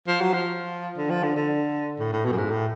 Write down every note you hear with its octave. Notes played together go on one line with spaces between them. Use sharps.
F3
F#3
F3
D3
F3
D3
D3
A2
A2
B2
F#2
G#2
A2